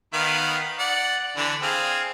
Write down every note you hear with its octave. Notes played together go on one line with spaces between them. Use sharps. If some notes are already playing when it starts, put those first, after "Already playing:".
D#3 B3 F5
D5 F#5
D3 E3 D4
C4 G#4 F5